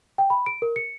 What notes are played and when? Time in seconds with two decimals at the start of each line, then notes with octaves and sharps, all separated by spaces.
0.18 G5
0.30 B5
0.46 D7
0.62 A#4
0.76 C#7